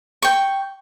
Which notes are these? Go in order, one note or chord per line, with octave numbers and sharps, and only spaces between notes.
G5 C#6